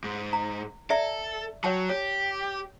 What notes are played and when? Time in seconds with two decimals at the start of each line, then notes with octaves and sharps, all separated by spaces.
0.04 G#2
0.33 A#5
0.90 A4 D5 E5 A#5
1.64 F#3 C#5 G5 A5
1.89 G4 C#5